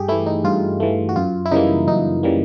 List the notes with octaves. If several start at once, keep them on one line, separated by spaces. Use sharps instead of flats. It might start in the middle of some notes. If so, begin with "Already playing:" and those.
Already playing: G2 G4 G#4
E3 A3 E4
D#4
G2 F4
E3 A3
F#4
F#2 F4
E4
C#3 E3 G3 A#3 D#4
F#2 D#4
C#3 E3 G3 A#3